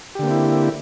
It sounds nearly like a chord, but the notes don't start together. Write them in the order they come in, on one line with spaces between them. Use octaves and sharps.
G4 D3 A#3 C4 E4